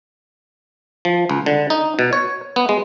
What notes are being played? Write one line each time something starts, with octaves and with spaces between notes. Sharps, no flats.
F3
C#2
D3
D#4
B2
C#5
B3
G#3